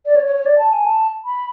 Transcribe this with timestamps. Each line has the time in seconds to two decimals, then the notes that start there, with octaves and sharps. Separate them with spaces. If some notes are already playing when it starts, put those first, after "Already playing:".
0.06 D5
0.16 C#5
0.26 C#5
0.36 C#5
0.46 D5
0.58 A5
0.73 G#5
0.86 A5
1.25 B5